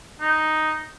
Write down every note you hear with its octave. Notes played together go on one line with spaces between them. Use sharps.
D#4